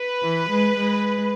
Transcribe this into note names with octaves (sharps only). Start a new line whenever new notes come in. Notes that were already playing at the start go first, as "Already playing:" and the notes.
Already playing: B4
E3
G#3
G#3